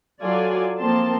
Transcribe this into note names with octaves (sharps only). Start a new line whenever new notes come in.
F#3 F4 A4 D5 G#5
F3 A#3 C4 A5 C6